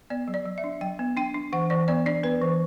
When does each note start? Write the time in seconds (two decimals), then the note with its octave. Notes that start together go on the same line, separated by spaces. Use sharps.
0.10 B3 D5
0.28 F#3
0.34 D5
0.46 F#3
0.58 E5
0.64 D4
0.81 F#3 G5
0.99 B3
1.17 D4 G5
1.34 D4
1.53 E3 F#5
1.70 E3 D5
1.88 B3 D5
2.06 D4 D5
2.23 B3 B4
2.42 E3